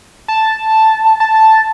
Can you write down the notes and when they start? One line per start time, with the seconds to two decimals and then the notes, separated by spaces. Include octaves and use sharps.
0.28 A5
1.20 A5